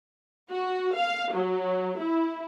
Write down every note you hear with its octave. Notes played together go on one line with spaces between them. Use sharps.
F#4
F5
F#3
E4